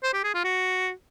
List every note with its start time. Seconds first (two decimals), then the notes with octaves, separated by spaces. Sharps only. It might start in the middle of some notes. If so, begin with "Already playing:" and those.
0.03 C5
0.13 G4
0.24 G#4
0.34 F4
0.44 F#4